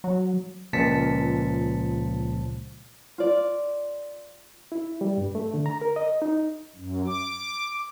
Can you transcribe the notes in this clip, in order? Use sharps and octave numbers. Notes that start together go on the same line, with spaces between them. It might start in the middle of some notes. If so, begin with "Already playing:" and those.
F#3
C#2 A#2 F3 A5 B6 C#7
F4 D5
E4
G3
G2
A3
D3
A#5
A#4
D#5
D#4
F#2
D6